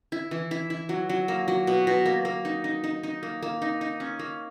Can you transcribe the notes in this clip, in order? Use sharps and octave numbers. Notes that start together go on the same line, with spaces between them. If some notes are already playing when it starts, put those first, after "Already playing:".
E4
E3
E4
E4
F#3
F#3
A#3
F#3
B2
B2
A#3
A#3
D#4
D#4
D#4
D#4
A#3
A#3
D#4
D#4
C#4
A#3